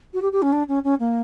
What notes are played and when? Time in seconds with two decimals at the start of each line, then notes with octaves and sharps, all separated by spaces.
0.14 F#4
0.22 G4
0.32 G4
0.42 C#4
0.52 D4
0.68 C#4
0.84 C#4
1.00 A#3